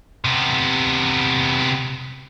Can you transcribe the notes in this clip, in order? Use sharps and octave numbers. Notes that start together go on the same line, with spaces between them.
C3 B3